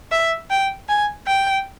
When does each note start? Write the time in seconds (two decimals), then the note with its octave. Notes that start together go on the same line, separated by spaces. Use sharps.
0.12 E5
0.50 G5
0.89 G#5
1.27 G5